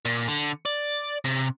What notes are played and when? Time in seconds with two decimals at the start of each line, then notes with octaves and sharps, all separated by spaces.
0.05 A#2
0.28 D3
0.65 D5
1.25 C3